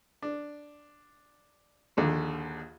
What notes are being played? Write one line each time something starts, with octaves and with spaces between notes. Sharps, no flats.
D4
A#1 D#2 D3